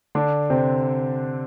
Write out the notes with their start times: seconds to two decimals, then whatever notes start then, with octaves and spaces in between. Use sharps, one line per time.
0.15 D3 D4
0.50 C3 C4